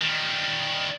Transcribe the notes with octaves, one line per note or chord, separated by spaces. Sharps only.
D#3 G3